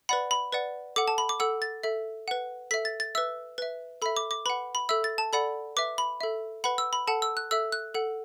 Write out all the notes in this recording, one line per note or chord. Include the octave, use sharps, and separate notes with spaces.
B4 D5 F#5 B5
B5
B4 D5 F#5
A4 F#5 D6
A5
B5
D6
A4 F#5 E6
A6
A4 E5
B4 F#5
A4 E5 B6
A6
A6
B4 E5 E6
B4 E5
A4 E5 B5
D6
D6
B4 F#5 B5
B5
A4 E5 E6
A6
A5
A4 D5 F#5 B5
B4 E5 D6
B5
A4 E5
B4 F#5 B5
E6
B5
A4 F#5 A5
E6
F#6
A4 E5 E6
F#6
A4 F#5